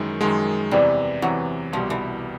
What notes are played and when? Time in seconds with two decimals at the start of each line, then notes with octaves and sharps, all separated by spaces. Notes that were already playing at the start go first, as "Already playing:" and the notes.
Already playing: F#2 D#3 E3 G#3
0.21 F#2 D#3 F3 G#3
0.71 E2 C3 E3 G3
1.22 E2 C3 E3 F#3
1.72 C2 B2 F3 G3
1.90 E3